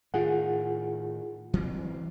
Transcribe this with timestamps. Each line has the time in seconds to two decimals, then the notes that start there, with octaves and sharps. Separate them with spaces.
0.14 A2 D#3 F4 G#4 F#5
1.54 E3 F#3 C4